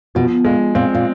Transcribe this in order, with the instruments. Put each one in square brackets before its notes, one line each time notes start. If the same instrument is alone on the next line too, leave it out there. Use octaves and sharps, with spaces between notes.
[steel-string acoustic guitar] B2 [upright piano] F3
[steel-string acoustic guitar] A#2 [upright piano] G#3
[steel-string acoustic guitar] A#2 [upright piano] C4
[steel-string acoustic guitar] A#2